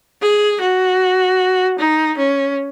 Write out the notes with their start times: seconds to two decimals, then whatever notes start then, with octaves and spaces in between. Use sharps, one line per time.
0.22 G#4
0.61 F#4
1.79 D#4
2.18 C#4